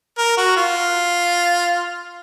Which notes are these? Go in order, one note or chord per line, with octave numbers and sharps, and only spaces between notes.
A#4
F#4
F4